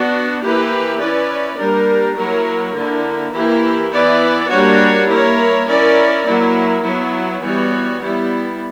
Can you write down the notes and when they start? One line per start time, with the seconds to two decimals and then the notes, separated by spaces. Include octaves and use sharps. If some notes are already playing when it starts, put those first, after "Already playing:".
Already playing: B3 D4 F#4
0.41 E3 A#3 E4 G4 B4
0.99 C#4 E4 B4 D5
1.57 G3 A#3 D4 A#4
2.16 F#3 A#3 E4 A#4 C#5
2.74 D3 A#3 E4
3.34 E3 A#3 E4 G4
3.91 E3 B3 E4 B4 D5
4.51 G3 A#3 D4 F#4 C#5
5.08 A#3 E4 A#4 C#5
5.68 C#4 E4 A#4 D5
6.26 F#3 A#3 E4
6.84 F#3 B3 E4
7.43 E3 G3 B3 F#4 C#5
8.01 G3 B3 E4